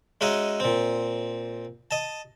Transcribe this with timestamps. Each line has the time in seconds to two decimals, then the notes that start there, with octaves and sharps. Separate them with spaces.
0.21 G#3 C#4 D#4 F#4 D#5 E5
0.60 A#2 C4
1.91 D#5 A5